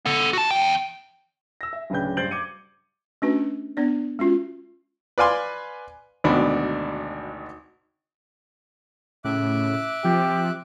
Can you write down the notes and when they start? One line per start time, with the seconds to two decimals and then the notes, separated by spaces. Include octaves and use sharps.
0.05 B3 A4
0.33 F#4 A5
0.51 E2 G5
1.61 E6 A#6
1.73 E5
1.90 D1 C#3 D4 B4 G5 G6
2.17 G2 C5 G6 A6 D7 F#7
2.31 D6 G#6 C#7 D#7
3.22 A3 C#4 D4 F#4 B4
3.77 B3 D4 D5
4.19 G#3 C#4 F4 F#4
5.18 B4 D5 F5 G#5 C6
6.24 G#1 D2 B2 D4 B5
9.25 A2 C#3 E5 D6 F#6
10.04 C3 F3 G4